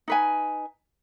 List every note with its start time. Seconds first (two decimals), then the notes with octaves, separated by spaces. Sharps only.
0.08 D#4 B4 G#5